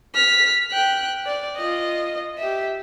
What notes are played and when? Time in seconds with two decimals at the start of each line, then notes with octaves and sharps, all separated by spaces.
0.15 F6 B6
0.71 G5 F#6
1.26 D5
1.57 F4 D#5
2.38 G4 E5